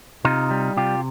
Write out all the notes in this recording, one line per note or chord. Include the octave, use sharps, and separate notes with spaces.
C3 D#4 F4
G3
C3 F4 G4